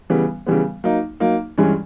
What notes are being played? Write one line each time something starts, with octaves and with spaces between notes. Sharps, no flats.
C#3 E3 G3 B3
C#3 E3 G3 B3
F#3 A#3 D#4
F#3 A#3 D#4
G2 E3 G#3 C#4